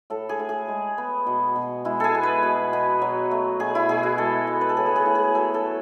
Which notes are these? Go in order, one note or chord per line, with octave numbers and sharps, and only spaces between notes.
A2 A4
G#4
A2
G#4
G#3
B3
B2
B2
G#3 E4
G#4 A4
B3
B4
B2
B2
F#3
A3
B2 G#4
E4
B2 G#4
F#4
G#3 A4
B3
B4
A4
A2 G#4
A4
G#4
A2
G#4
F#3 A4
A4
A3